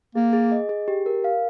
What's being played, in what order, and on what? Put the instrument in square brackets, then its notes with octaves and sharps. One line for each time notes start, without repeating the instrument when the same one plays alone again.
[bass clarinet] A#3 [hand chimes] G#4
[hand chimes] G#4
D#5
G#4
G4
A#4
F5